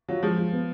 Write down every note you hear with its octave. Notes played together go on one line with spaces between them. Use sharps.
F#3 F4
F3 G#3
F4
B3